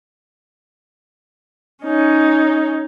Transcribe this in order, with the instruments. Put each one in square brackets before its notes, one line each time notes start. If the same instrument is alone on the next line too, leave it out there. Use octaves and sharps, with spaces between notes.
[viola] C#4 D#4